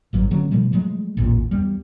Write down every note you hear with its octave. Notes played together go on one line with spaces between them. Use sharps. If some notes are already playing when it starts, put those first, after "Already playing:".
G#1 G2 F#3
D3 F#3 A3 C#4
B2 F3 G3 A3
F3 F#3 G#3 A3
A1 D#2 A#2
E2 G3